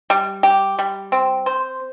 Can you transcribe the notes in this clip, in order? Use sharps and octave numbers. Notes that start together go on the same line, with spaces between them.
G3
G4
G3
C4
C5